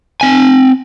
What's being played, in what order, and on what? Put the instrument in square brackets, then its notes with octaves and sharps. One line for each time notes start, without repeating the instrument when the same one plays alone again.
[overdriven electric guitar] C4 G#5